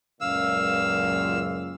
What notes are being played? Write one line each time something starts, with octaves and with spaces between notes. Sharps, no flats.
C#2 F#2 A#2 F5 E6